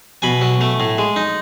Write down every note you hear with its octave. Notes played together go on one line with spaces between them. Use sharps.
B2 G#5 B5
F#3
A3
A2
G#3
D#4